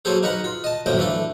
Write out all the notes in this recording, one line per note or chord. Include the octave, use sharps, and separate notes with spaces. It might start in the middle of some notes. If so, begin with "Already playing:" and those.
F#3 A#3 G#4 A4 C5
D#4 A#4 B4 F#5 A#5 B5
F4
D#5 A5
F#2 A2 D3 F3 A#3 G5
E3 A3 D4 A4